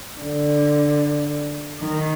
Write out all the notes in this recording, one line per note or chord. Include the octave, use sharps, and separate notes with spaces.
D3
D#3